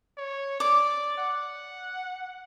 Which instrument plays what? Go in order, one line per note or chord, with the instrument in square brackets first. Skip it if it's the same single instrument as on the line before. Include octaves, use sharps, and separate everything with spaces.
[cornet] C#5
[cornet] D5 [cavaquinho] D6
[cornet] F#5